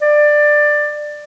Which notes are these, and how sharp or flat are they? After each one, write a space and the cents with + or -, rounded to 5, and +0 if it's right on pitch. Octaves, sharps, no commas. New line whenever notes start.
D5 +15